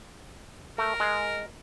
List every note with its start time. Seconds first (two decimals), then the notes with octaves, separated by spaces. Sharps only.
0.78 A3 A#4
1.00 G#3